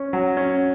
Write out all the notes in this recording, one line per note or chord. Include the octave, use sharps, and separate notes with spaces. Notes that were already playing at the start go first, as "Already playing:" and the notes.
Already playing: C#4
F#3
C#4